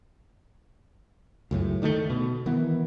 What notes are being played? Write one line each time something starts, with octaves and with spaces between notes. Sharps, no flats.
C#2 F#2 A2
D3 D#3 G3 A3
B2
D#3 E3 B3